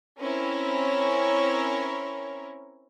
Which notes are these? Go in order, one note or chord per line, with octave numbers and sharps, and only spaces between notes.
C4 C#4 E4 A#4 C#5